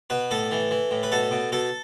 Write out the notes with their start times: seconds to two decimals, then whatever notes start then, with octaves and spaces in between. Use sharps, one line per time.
0.10 B2 B4
0.31 A2 A4
0.51 E3
0.71 E3
0.91 A2
1.03 B4
1.12 B2 A4
1.31 B2
1.52 B2 A4